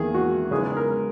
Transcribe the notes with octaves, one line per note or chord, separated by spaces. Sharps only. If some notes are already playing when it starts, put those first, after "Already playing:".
Already playing: E2 D#3 A#3 G#4
F#4
C#3 G#3 B3 D#4 G#4
G#4
A#4